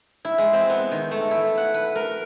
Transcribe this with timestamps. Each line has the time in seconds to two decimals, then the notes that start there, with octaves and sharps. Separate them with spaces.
0.25 E4
0.38 G#3
0.53 C4
0.70 B3
0.92 D#3
1.11 A3
1.31 E4
1.57 F#5
1.74 B4
1.95 A#4